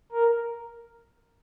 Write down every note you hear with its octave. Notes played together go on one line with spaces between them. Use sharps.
A#4